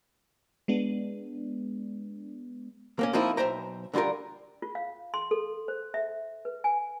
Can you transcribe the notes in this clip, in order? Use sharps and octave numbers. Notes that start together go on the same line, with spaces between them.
G#3 B3 D4
A#3 C4 C#4
F3 A#3 C4 D#4 E4
B1 F#3 C5 E5 G5 A#5
D3 G3 F4 G4 A#4
F4
F5
C6
A4
C5
E5
B4
G#5